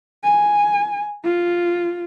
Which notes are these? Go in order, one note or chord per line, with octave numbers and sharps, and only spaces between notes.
G#5
F4